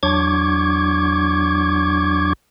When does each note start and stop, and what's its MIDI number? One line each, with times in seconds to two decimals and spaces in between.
0.03 2.33 40
0.03 2.33 54
0.03 2.33 62
0.03 2.33 85
0.03 2.33 86
0.03 2.33 92